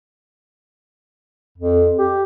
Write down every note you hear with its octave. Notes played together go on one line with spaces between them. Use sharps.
F2
G4